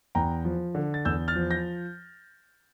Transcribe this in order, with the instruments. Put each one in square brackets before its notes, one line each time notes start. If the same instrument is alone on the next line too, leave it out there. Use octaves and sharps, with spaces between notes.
[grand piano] E2 G5 A#5
F3
D3
A6
E2 E6 G6
F6 A6
F3
G6 A#6